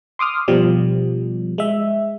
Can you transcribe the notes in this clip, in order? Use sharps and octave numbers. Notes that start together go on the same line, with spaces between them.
C6 D6 D#6 F6
B2 F3 G3
G#3 E5